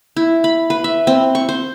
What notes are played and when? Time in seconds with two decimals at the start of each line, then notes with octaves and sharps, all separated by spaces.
0.17 E4
0.44 B5
0.70 B4
0.84 E5
1.07 C4
1.35 C#6
1.49 C5